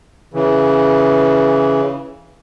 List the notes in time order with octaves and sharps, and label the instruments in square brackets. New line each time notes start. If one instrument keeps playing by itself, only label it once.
[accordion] C#3 E3